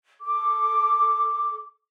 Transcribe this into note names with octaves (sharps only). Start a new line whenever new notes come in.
A4 D6